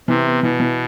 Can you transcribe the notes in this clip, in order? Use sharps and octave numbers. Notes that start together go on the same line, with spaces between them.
C3 E3
B3
B2 E3
E3